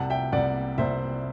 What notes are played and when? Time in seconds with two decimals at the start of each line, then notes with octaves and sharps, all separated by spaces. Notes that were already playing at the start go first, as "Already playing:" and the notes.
Already playing: C2 C3 G3 F#5 A5
0.10 E5 G5
0.32 C2 C3 G3 D5 F#5
0.78 C2 C3 G3 C5 E5